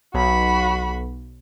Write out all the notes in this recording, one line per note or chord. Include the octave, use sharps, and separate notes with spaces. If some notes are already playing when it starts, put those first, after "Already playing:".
B1 F#4 B5